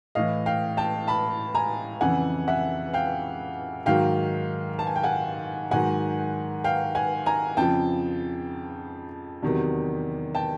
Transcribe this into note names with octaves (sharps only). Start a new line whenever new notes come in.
A2 E3 D#5 F5
F5 G5
G5 A5
A5 B5
G#5 A#5
F2 C#3 E3 F#5 G#5
E5 F#5
F5 G5
G#2 D#3 F#3 F5 G5
A5
G#5
G5
F#5 G#5
G#2 D#3 F#3 F#5 G#5
F5 G5
F#5 G#5
G#5 A#5
F2 C#3 F3 G5 A5
E2 C3 D#3 F#3
G5 A5